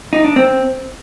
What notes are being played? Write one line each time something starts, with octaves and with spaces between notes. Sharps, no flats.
D#4
D4
C4